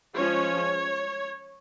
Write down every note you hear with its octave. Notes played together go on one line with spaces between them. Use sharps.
F3 G#3 C#4 C#5